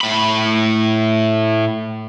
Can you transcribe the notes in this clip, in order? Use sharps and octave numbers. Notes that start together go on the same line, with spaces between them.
A2 B5